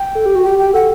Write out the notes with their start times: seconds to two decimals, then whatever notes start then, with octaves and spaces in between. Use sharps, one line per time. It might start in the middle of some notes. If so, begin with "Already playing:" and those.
Already playing: G5
0.15 A4
0.26 G4
0.35 F#4
0.44 G4 G5
0.59 G5
0.74 A4 F#5